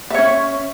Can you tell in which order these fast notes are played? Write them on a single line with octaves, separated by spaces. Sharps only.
E5 C#5 C#4